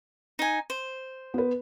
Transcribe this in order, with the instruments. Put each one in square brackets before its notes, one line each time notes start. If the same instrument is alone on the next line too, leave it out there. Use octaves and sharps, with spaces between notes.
[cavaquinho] D#4 G#5
C5
[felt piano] B3 B4